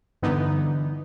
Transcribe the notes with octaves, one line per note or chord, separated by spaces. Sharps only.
G2 D3 E3 B3 D#4